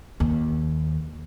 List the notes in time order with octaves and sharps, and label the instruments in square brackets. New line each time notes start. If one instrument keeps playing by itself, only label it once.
[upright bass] D#2